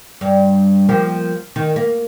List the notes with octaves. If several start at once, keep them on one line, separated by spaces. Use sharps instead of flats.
G2
F3 A#3 G4
D#3
A#3